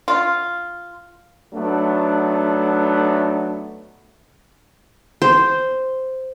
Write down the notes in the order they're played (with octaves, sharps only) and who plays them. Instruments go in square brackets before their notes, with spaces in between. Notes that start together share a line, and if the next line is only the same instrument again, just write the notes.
[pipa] F4
[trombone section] F#3 A3 B3 D4 D#4
[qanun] C5